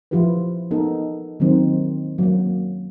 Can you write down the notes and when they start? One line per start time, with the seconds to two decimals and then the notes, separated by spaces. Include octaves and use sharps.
0.11 F3 E4 F4 G4 B4
0.71 B3 D#4 A4 A#4
1.40 D#3 F#3 A#3 C4 D#4
2.18 F#3 A#3